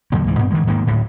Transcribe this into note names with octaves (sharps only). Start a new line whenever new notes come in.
E2 D3 F#3 A#3
C#2 G#2 E3
G2 B3 C4
D3 D#3 G3 G#3
G#2 D#3 A#3
D1 A2